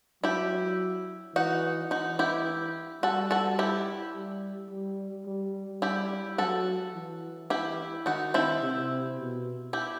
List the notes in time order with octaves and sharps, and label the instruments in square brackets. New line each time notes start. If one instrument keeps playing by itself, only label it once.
[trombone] F#3 [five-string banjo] E4 G4
[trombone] E3 [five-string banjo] D#4 F#4
[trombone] E3 [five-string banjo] D#4 F#4
[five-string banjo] E4 G4
[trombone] G3 [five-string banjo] F#4 A4
[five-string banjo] F#4 A4
E4 G4
[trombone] G3
G3
G3
[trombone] G3 [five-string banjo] E4 G4
[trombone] F#3 [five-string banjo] F#4 A4
[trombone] E3
[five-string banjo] E4 G4
[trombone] D#3 [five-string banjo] D#4 F#4
[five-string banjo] C4 E4
[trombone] C3
B2
[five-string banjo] E4 G4